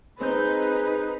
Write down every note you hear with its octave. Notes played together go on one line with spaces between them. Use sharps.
C4 D#4 G#4 B4 G6